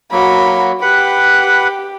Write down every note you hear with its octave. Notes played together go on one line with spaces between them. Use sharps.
F#3 A#3 F#4 B5
G4 B4 F#5 B5